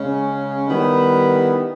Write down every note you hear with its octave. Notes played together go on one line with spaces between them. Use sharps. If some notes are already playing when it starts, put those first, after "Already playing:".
Already playing: C#3 G#3 C#4
D#3 G3 B3 E4